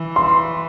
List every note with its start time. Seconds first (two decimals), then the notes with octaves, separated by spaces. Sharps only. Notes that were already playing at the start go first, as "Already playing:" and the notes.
Already playing: E3
0.16 C6